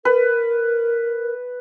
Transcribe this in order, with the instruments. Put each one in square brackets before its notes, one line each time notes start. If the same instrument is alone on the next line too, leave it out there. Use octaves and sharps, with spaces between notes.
[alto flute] A#4 [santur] B4